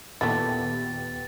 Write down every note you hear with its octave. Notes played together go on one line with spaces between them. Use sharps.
D#2 A#2 A3 B3 E4 G4 A6